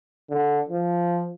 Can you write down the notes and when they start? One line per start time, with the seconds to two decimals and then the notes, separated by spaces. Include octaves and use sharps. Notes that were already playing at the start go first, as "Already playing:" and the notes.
0.30 D3
0.69 F3